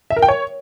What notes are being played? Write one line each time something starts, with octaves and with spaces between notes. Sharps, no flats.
E5
A#4
G5
C#5